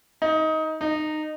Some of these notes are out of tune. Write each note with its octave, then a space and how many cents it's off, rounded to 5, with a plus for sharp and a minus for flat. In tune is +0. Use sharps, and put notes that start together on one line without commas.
D#4 +20
D#4 -20